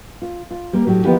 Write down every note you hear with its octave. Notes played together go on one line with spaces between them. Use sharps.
F4
F4
G3 A#3 A#4
A2 F#3 G4
D#3 F3 B3 E4 F4 G4